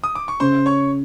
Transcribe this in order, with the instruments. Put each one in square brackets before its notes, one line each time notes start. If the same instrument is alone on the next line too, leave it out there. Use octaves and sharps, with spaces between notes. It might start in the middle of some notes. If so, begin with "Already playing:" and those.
[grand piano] D#6
D6
C#6
[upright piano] C#3 [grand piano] C5 C6
[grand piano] C#5 C#6